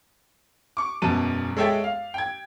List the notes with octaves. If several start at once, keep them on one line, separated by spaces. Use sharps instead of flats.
C#6 D6
E1 F#2 B2 A5 D#7
G#3 A4 C#5 E5 G5 A6
F5
G5 G#6